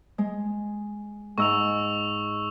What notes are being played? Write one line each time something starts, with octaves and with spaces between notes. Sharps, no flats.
G#3
G#2 D#5 C#6 E6 F7